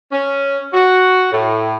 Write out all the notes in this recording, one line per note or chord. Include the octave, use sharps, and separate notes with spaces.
C#4
F#4
A2